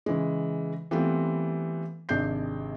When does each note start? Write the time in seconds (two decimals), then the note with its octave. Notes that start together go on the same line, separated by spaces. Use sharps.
0.06 C#3 E3 G#3
0.91 E3 G3 A3 B3 C4 F4
2.09 G#1 C3 G#3 D4 G6 C7